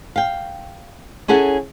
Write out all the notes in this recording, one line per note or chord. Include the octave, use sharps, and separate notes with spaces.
F5 G5
C#4 E4 G#4 A4 F#5